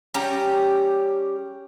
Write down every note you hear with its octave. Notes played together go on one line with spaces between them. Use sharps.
G3 C#4 G4 A#5